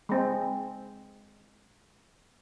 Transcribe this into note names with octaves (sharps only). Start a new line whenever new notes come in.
G#3 C4